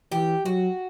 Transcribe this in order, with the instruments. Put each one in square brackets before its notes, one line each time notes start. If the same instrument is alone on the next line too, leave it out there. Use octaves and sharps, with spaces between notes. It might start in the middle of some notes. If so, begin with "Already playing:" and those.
[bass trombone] E3 [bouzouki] G4
[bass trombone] F#3 [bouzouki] F#4